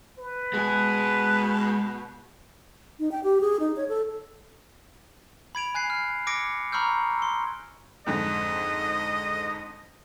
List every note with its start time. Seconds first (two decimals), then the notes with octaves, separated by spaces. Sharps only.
0.19 B4
0.54 B2 G#3 G#4
3.00 D#4
3.12 G5
3.24 G4
3.41 G#4
3.60 D#4
3.77 C#5
3.89 A4
5.55 B5 G#6 D7 F7
5.75 G#5 F#6 G#6 C7
5.90 F6
6.27 D6 E6 G#6 A#6 C#7 D7
6.72 A#5 B5 C#6 E6 F6 G6
7.19 C6 E6
8.06 F2 G#2 D3 D#5